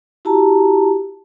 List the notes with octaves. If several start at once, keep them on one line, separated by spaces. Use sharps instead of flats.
E4 F#4 G4 A5 A#5